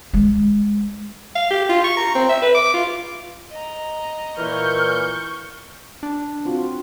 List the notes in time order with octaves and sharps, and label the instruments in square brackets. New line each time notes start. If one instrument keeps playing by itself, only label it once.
[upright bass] G#3
[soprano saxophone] F5
G4
F4
C#6
A#5
C4
E5
B4
D6
F4
[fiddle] D#5 A#5
[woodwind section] A#2 E3 [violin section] C#6 G6 [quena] F6
[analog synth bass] D4
[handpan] C4 F4 F#4